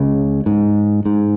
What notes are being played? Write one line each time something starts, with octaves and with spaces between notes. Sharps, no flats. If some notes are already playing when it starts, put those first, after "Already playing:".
Already playing: C#2 C#3
G#2
G#2